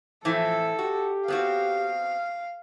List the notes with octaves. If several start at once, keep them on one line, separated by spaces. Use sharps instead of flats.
A2 E3 F3 C4 A4
F#4 G4
B3 C4 F#4 F5